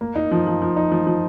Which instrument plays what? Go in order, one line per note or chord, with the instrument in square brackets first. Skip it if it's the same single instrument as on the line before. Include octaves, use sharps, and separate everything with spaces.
[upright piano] A#3
D#4
F3
F3
F3
D#4
F3
F3